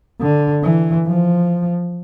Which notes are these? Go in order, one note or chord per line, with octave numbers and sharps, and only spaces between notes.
D3
E3
F3